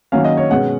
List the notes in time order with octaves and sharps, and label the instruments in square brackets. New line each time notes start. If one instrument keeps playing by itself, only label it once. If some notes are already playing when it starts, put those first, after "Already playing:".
[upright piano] D#3 F#3 A#3 C#4 F5
D#5
C#5
B2 G#3 C#4 F#5